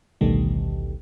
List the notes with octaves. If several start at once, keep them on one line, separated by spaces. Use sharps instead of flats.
A1 D2 B2 D#3 G3 A3